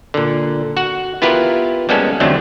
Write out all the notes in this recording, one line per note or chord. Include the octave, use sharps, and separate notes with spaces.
A#2 D3
F#4 F#5
B3 E4 F4 G4 A#4 B4
G3 G#3 A#3 B3 C#4 A4
E2 D3 F#3 A3 C4 D4